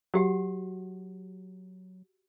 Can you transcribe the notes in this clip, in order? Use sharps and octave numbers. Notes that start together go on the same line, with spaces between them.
F#3 F#4 G4 F#5